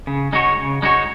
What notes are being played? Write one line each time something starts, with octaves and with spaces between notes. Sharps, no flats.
C#3
G#3 D#4 F#4 C#5
C#3
G#3 D#4 F#4 C#5